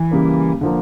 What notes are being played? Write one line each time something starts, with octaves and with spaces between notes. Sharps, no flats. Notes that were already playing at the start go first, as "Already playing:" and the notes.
Already playing: E3
C#3 G3 A#3
D3 F3 A#3